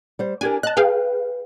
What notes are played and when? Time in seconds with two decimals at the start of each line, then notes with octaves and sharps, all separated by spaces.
0.19 G3 C5
0.41 D4 G4 A#4 G#5
0.63 D#5 A5 F#6
0.77 G#4 B4 F5 G5